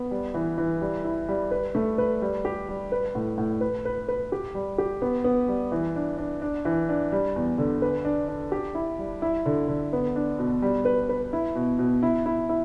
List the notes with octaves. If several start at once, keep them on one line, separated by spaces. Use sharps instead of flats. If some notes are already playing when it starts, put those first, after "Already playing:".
Already playing: B3
G3
E3
E3
G3
E4
G3
B4
A3
B4
G3
G4
G3
B4
A2
A2
B4
B4
B4
G4
G3
G4
B3
B3
G3
E3
D4
D4
D4
E3
D4
G3
E2
D3
B4
D4
D4
G4
E4
G3
E4
D3
D3
B3
D4
B2
G3
B4
B4
E4
B2
B2
E4
E4
E4